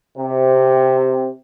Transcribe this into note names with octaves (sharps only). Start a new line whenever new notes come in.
C3